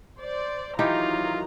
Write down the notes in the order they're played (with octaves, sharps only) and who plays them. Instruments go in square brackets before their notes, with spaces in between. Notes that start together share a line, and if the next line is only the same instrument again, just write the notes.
[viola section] C5 D5
[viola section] D#3 F#3 A#5 [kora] E3 D#4 G4 [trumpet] F4